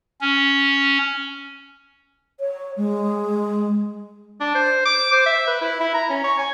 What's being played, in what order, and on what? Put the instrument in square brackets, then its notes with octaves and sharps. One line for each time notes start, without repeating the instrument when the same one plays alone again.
[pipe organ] C#4
[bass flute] C#5
G#3
[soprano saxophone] D4
C5
D6
C5
E5
B4
E4
E4
A#5
C#4
C#5
G#5